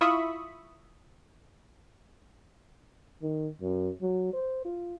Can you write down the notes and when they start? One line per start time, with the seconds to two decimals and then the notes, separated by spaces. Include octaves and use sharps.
0.01 E4 F4 E5 B5 C#6 D#6
3.22 D#3
3.61 F#2
4.02 F#3
4.33 C5
4.65 F4